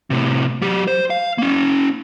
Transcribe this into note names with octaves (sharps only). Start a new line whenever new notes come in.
A2 C3
F#3 G4
C5
F5
A#3 C#4